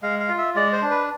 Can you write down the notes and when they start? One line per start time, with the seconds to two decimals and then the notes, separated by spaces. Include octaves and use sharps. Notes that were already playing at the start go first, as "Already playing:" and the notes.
0.02 G#3 F5
0.20 F5
0.29 F4
0.38 E5
0.55 G#3 D5
0.73 C5
0.82 D4
0.91 B4